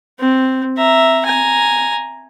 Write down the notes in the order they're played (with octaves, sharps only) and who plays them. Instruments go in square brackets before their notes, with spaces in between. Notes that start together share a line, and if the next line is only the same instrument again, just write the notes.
[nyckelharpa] C4
E5 A#5
G#5 A#5